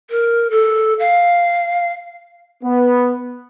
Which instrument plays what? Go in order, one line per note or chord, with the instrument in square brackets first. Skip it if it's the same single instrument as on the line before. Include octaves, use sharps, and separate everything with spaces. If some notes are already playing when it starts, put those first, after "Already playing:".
[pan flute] A#4
A4
F5
[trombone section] B3